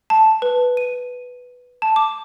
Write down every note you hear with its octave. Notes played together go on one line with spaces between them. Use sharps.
A5
B4
D#7
A5
D6